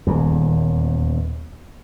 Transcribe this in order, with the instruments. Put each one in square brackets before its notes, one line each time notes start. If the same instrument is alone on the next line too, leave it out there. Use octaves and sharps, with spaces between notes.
[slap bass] D#1 E2